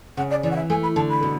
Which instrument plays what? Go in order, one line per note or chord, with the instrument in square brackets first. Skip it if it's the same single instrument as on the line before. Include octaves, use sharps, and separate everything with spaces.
[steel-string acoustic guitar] C#3 [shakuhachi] F#5
[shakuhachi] D5
[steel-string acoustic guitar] E3 [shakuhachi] D5
[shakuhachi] F#5
E5
[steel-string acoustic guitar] A3 [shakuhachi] G#5
[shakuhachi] B5
[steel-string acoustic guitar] D3 [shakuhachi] A5
[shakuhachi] B5
[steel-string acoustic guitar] B2